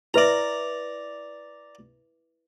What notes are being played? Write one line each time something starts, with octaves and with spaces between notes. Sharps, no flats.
E4 B4 D5 E5 A#5